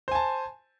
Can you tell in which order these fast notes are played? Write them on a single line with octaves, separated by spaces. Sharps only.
C5 G#5 A5